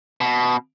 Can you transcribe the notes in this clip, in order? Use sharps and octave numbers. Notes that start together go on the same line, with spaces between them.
B2